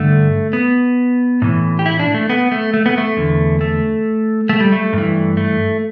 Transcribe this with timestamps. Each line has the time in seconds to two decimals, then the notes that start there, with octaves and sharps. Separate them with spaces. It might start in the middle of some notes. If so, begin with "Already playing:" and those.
Already playing: G2 D3 A3
0.53 B3
1.42 A2 E3
1.79 G4
1.86 E4
2.00 D4
2.14 A3
2.29 B3
2.52 A3
2.74 A3
2.86 B3
2.98 A3
3.17 E2 D3
3.61 A3
4.49 A3
4.60 G3
4.72 A3
4.93 G2 E3
5.37 A3